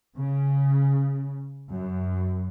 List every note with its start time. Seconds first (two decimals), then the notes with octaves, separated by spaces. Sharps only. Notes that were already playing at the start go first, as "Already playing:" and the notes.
0.17 C#3
1.71 F#2